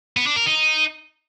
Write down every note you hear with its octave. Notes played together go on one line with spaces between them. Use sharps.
B3
D4
A#4
D#4